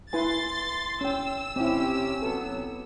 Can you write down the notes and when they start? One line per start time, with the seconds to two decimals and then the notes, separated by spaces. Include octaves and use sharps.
0.13 E4 B4 G#5 C6 A6
1.01 C#4 G5 E6
1.56 C3 C4 C#4 E4 G4
2.22 F#3 B3 A4